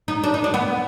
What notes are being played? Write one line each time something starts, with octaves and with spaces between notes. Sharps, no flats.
D#4
D4
D#4
D4
B3